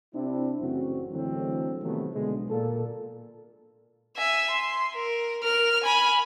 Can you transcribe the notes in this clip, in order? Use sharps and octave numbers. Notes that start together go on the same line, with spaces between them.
C3 C4 D4 E4
A1 F#2 C#3 C4 F#4
A2 D3 E3 F#3 G#3 C4
C3 D#3 F3 F#3 A3 B3
B1 B2 D3 G#3
A#2 A4
E5 G#5
C6
A#4
A#4 F6
G#5 B5